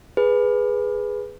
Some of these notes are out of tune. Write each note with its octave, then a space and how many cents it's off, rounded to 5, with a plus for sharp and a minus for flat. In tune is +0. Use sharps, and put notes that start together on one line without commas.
G#4 +0 B4 +0